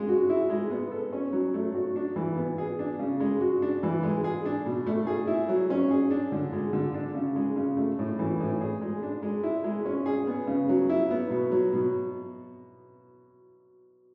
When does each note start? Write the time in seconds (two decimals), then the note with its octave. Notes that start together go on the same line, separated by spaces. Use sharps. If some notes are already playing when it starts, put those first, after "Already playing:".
Already playing: C#3 G#3
0.09 F#4
0.30 E4
0.50 G#3
0.71 B3
0.91 A4
1.13 C#4
1.33 F#3
1.54 A3
1.74 F#4
1.96 D4
2.16 E3
2.37 B3
2.58 G#4
2.79 D4
2.99 C#3
3.20 G#3
3.41 F#4
3.62 D4
3.83 E3
4.03 G#3
4.24 G#4
4.45 D4
4.66 B2
4.87 A3
5.07 G#4
5.27 E4
5.49 F#3
5.70 C#4
5.91 G#4
6.11 D4
6.32 D3
6.53 G#3
6.73 D3
6.94 D4
7.15 C#3
7.36 G#3
7.56 C#3
7.77 A3
7.99 A2
8.19 E3
8.40 A2
8.61 G#4
8.81 G#3
9.03 D4
9.22 G#3
9.43 E4
9.64 G#3
9.86 C#4
10.06 G#4
10.27 B3
10.47 C#3
10.69 F#3
10.89 E4
11.11 B3
11.30 B2
11.52 F#3
11.73 B2